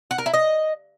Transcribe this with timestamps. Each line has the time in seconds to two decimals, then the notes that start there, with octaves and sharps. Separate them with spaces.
0.11 F#5
0.18 A#4
0.26 E4
0.33 D#5